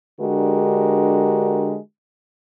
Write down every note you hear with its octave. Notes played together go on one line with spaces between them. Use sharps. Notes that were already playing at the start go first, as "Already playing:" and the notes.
D3 G#3 D4 F#4 G4 A#4